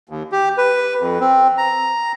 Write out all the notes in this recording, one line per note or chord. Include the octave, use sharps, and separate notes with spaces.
D#2
G4
B4
F2
C4
A#5